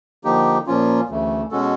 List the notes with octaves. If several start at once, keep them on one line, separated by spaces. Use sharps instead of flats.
D3 F3 A#3 D#4 G4
A#2 F3 A#3 C#4 F4
D2 C#3 E3 A3
B2 G#3 C#4 F#4 A4